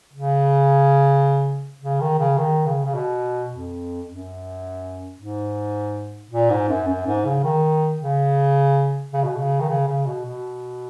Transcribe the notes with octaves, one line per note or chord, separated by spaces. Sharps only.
C#3
C#3
D#3
C#3
D#3
C#3
C#3
B2
F2
F#2
G#2
A#2
G#2
F#2
F#2
G#2
C#3
D#3
C#3
C#3
B2
C#3
D#3
C#3
C#3
B2
B2